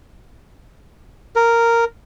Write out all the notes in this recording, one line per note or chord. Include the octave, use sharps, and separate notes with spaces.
A#4